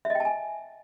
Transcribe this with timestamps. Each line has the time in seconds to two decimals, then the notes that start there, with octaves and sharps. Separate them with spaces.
0.05 E5
0.10 D#5
0.15 G5
0.20 A5
0.25 G#5